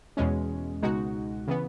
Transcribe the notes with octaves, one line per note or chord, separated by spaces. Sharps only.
E2 B2 G#3 C#4
C#2 B2 G#3 D#4 F#4
C#3 E3 B3